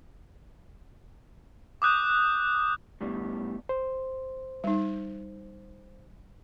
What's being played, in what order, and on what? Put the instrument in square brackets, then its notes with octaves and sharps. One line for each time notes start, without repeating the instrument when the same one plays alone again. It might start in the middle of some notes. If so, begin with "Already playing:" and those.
[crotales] D6 D#6 F#6 G6
[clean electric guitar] A2 G3 B3 D4
[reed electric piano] C5
[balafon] G3 D#4